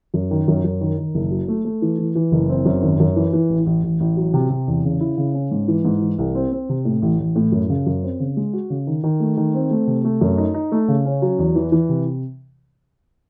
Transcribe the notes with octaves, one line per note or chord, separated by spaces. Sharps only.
F#2
D#3
F#2
F#2
D#3
D#3
F#1
F#3
A3
A3
E3
E3
E3
F#1
C4
F#2
G#1
F#2
E3
E3
A1
A1
A1
A1
F#3
C3
C3
E2
C#3
E4
C#3
C#4
G#2
E3
G#2
E3
C2
C4
C4
C3
A2
A1
A1
A2
F#2
C#3
F#2
C4
C#3
G#3
F#4
C#3
D#3
D#3
A3
D#3
C4
A3
C3
A3
F#2
D#4
D#4
A3
C#3
C#4
F#3
E2
E3
E3
C3